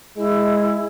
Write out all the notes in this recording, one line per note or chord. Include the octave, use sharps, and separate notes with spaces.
G#3 E4